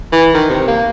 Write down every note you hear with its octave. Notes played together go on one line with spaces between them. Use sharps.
E3
D#3
C3
A#3